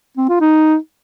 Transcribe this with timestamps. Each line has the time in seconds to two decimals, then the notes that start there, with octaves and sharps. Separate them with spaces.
0.17 C4
0.29 F4
0.41 D#4